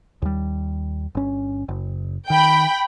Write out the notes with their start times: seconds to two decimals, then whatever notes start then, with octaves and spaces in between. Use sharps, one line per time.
0.22 D#2 G3
1.15 G1 C#4
1.69 F#1
2.30 D#3 G5 B5